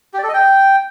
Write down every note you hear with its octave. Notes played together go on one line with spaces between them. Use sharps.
G4
D5
A4
D#5
G5